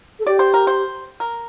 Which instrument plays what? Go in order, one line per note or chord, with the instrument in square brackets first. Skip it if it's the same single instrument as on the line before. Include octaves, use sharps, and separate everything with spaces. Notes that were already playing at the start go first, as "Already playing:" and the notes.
[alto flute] A4
[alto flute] G4 [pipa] D5
[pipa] C5
A#4
C5
A#4